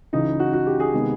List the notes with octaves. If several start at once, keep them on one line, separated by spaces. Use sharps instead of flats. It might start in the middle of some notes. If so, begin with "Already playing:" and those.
C#2 C#3 E3 D#4
F#4
F#4
G4
G#4
C3 D#3 G#3 B3